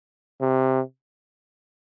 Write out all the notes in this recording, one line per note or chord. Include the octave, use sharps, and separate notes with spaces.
C3